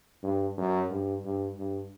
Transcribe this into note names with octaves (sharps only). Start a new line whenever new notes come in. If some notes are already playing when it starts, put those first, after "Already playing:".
G2
F#2
G2
G2
G2